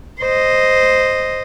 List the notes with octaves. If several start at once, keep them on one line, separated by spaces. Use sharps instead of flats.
C5 D#5